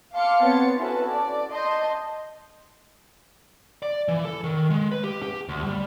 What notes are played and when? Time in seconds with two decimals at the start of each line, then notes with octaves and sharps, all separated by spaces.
0.12 F5 A5 C6 D6 F6 C#7
0.42 B3 C4 C#5 C6 A6 C#7
0.77 C#4 E4 F#4 A4 B4 A5
1.10 D5
1.51 D#5 A5 C6 G6
3.82 D5
4.08 E3
4.25 A4
4.44 D#3
4.70 G#3
4.92 B4
5.03 G4
5.22 G4
5.48 D2
5.64 G3